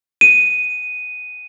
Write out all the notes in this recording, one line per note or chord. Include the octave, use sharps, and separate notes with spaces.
D#7